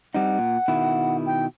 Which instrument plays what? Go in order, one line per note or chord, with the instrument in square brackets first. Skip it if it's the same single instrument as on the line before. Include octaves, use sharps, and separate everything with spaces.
[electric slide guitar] G3 C4 D#4 [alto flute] F#5
[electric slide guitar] A#2
B2 D#3 E4
[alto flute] G5